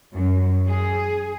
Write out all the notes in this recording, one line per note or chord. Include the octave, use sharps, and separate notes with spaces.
F#2
G#4